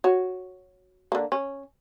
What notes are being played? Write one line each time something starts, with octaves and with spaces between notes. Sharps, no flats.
F#4 C#5
D3 A#3
C#4